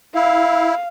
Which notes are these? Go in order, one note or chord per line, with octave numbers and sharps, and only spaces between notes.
E4 F5